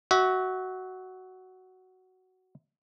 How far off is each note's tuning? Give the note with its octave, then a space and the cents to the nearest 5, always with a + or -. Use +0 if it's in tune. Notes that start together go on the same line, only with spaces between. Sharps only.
F#4 +10 E5 -25